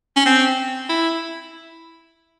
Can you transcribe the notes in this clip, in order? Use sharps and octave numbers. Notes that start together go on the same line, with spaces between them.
C#4
C4
E4